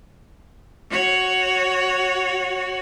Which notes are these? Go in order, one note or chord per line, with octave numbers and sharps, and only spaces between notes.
F#4 C#5